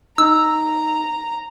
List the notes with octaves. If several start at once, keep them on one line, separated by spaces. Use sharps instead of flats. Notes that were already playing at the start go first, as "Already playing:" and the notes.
D#4 A#5 E6